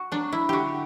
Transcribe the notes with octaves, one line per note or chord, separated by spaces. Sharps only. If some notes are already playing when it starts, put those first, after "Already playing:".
Already playing: F#4
F#3 D4
E4
D3 F#4 G4